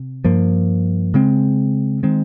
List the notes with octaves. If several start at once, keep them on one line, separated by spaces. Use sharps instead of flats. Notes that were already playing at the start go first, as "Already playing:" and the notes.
Already playing: C3
G2 F3 A#3
C#3 G#3 C4
D#3 G#3 C4